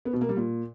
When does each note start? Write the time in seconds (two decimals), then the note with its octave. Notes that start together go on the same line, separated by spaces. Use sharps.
0.05 B3
0.13 B2
0.21 A#3
0.29 G3
0.37 A#2